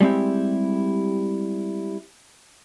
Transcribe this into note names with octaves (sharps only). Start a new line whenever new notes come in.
G3 G#3 C4 E4 G4